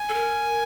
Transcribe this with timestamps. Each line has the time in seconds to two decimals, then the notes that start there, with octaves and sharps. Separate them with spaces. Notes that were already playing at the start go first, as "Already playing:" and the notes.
Already playing: G#5
0.09 A4
0.14 A#4